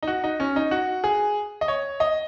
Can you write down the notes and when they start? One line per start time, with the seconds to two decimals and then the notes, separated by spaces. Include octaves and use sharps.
0.03 D#4
0.08 F#4
0.24 D#4
0.40 C#4
0.56 D#4
0.71 F#4
1.04 G#4
1.61 D#5
1.68 C#5
2.00 D#5